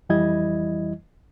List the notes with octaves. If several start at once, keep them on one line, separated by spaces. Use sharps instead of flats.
F2 E3 G3 E4 D#5 G#6